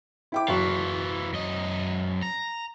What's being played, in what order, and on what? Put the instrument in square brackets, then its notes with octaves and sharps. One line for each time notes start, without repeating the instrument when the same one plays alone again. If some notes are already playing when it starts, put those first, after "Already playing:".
[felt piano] E4 G5 D6
[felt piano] F#1 F#4 [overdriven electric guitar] E3 F4
[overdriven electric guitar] F#2 D#5
A#5